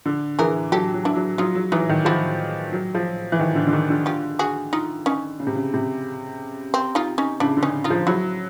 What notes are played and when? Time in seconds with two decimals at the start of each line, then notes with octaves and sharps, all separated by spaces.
0.06 D3
0.39 E3 G#4 A#4
0.72 F#3 G4 A4
0.94 F#3
1.05 D4 E4
1.16 F#3
1.38 F#3 D#4 F4
1.55 F#3
1.72 E3 D#4 F4
1.89 D#3
2.05 F3 E4 F#4
2.72 F#3
2.95 F3
3.32 E3
3.39 D#3
3.55 D3
3.67 D3
3.73 D#3
3.90 D3
4.06 F4 G4
4.39 F#4 G#4
4.73 D#4 F4
5.06 C#4 D#4
5.40 C#3
5.47 C3
5.55 C#3
5.74 C3
6.74 C4
6.95 D#4 F4
7.18 C#4 D#4
7.40 C#3 D4 E4
7.57 D3
7.63 C#4 D#4
7.84 D#4 F4
7.90 F3
8.07 F#3 E4 F#4